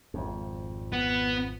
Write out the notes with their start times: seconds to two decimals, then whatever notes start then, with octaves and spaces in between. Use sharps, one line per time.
0.14 G#1 F2
0.92 B3